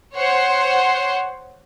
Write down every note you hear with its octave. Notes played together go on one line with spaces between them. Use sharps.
C5 C#5 F#5 C6